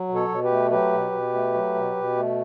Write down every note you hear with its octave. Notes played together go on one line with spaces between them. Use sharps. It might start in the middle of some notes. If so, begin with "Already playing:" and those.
Already playing: F#3
B2
A4 C#5
B2
G4 B4
A3
F#3 G4 B4
B2
B2
A3
F#3
B2
B2
A3